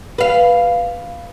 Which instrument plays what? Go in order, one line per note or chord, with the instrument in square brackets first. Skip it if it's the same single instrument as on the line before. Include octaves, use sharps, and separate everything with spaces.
[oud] B4 F5